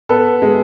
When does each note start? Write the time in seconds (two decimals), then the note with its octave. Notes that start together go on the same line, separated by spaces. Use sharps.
0.09 B3 A4 B4
0.42 G#3